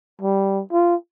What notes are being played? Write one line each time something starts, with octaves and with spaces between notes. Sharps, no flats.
G3
F4